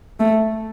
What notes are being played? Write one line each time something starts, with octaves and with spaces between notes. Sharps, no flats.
A3